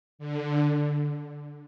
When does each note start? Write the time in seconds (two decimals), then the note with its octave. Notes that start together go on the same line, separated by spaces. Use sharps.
0.19 D3